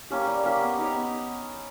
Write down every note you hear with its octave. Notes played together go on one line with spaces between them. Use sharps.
A#3 C#4 G4
G3
A#3 C#4 G4
B3
D#4 G4 C#5
B3